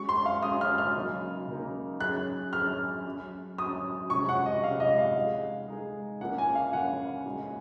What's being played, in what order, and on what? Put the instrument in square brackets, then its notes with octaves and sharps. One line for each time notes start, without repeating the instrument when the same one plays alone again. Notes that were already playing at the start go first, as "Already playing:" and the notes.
Already playing: [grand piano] G#3 C#4 F#4 [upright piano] C#6
[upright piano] C6
F5
[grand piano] G#3 C#4 F#4 [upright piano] D#6
[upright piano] F6
F6
[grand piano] C#3 F#3 A#3 D#4
C#3 F#3 A#3 D#4
[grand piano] F#3 C#4 G#4 [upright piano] F#6
[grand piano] F#3 C#4 G#4 [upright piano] F6
[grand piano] F#3 C#4 F#4
[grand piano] F#3 C#4 F#4 [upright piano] D#6
[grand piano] C3 F3 G#3 C#4 [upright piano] C#6
[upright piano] F#5
D#5
[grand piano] C3 F3 G#3 C#4 [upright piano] F5
[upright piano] D#5
F5
[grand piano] G#3 D#4 G#4
G#3 D#4 G#4
[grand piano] C#3 F3 A#3 C#4 F4 [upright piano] F#5
[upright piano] G#5
F5
[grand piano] C#3 F3 A#3 C#4 F4 [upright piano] F#5
[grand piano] A#2 G#3 D#4 F#4